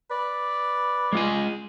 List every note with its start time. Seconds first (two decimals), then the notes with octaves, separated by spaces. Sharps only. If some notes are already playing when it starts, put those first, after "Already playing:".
0.10 B4 D5
1.13 G#3 F4 G#5